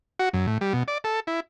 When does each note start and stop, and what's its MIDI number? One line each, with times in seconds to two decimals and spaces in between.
0.19 0.29 66
0.34 0.46 42
0.47 0.58 45
0.61 0.73 55
0.73 0.83 47
0.88 0.98 74
1.04 1.20 69
1.27 1.40 64